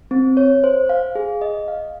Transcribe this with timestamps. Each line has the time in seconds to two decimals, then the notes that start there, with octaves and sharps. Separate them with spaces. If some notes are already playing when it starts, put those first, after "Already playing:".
0.11 C4
0.37 C#5
0.64 C5
0.89 F5
1.15 G#4
1.41 D#5
1.68 F5